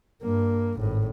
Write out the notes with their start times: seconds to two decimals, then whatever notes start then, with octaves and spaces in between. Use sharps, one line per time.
0.23 G2 A#3
0.79 G#1 A2